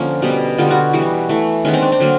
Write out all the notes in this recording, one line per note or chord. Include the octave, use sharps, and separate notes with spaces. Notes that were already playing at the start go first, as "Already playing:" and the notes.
Already playing: D3 F3 A#3 C#4
B2 G3 B3
D3 G3 B3 F4
F#4
E3 G3 B3 F#4
E3 A3
D#3 G#3 B3 C#4
C4
D4
C4
D3 F#3 A#3